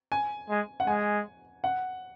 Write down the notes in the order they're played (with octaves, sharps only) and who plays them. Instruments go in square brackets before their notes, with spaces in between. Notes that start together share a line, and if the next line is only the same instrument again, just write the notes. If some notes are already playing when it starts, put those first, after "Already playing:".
[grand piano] G#5
[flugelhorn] G#3
[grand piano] F#5
[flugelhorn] G#3 [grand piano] G#5
[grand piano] F#5